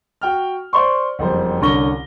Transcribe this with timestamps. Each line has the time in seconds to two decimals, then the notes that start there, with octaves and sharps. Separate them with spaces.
0.21 F#4 G5 F6
0.73 C5 D5 C6 C#6
1.19 F#1 F2 G3 C5
1.61 C2 D3 C#4 C#6 A#6 G7